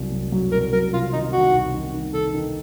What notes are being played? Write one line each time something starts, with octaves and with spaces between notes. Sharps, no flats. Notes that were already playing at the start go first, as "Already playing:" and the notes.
Already playing: C2 F#3
F#3
F#3
C2 A#4
F#3 A#4
C3 F4
D#3 D#4
D#3 F#4
C2
D#3
D#3
D#3 A4
D#3